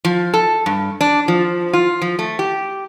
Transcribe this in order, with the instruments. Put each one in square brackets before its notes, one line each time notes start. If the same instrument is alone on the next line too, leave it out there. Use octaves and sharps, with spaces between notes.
[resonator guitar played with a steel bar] F3
A4
G2
D4
F3
F4
F3
A3
G4